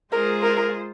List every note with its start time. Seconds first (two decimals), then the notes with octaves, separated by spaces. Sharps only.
0.12 G#3 F4 G#4 A#4 C5
0.43 A#4